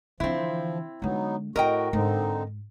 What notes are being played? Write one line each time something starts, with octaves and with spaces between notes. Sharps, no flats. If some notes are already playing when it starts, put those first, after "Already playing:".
D3 E3 F3 C4 E4
D3 F#3 G#3 B3 D#4
A2 C4 F#4 A#4 D#5 G5
G#2 D3 C4 D#4